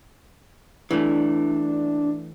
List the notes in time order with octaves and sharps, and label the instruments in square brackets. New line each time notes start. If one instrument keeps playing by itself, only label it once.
[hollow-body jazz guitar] E3 A3 [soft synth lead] D4